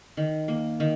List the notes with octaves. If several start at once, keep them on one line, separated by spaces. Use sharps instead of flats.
D#3
A#3
D#3